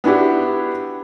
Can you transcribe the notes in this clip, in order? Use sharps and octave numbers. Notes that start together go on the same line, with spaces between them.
B3 D4 E4 F#4 G4